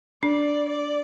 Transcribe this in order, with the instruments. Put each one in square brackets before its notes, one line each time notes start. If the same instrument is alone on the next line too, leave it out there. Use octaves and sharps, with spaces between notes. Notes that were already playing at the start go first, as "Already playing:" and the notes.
[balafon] D4 [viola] D5
[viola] D5